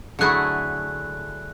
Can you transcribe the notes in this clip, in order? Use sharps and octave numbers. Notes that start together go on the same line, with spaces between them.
D3 F#3 A3 E4 G#4 F#6